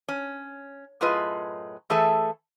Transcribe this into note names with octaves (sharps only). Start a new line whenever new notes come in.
C#4
F#2 A2 F4 G#4 B4 D#5
E3 A3 G#4 A4 E5